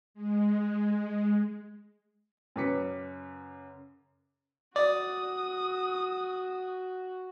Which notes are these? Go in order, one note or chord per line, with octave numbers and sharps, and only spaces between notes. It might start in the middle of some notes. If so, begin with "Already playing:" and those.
G#3
F#2 C#3 B4 D6 B6 C#7
F#4 D5 D#6